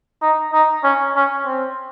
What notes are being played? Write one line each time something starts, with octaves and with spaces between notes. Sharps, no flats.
D#4
D#4
C#4
C#4
C4